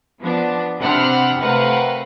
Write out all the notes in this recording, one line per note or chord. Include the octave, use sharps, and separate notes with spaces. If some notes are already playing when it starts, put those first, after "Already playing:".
F3 B3 D4
C3 C4 D4 F#5 B5 F6
C3 A3 A#4 B4 F5 F#5